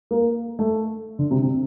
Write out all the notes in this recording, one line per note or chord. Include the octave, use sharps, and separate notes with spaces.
A#3
A3
D3
C3
C3